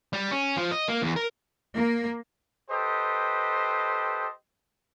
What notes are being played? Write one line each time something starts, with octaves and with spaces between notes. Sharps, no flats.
G3
C#4
F3
D#5
A#3
E2
A#4
A#3
G4 A4 B4 C5 D#5